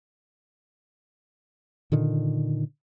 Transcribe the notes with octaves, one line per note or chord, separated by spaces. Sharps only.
A#2 D3 D#3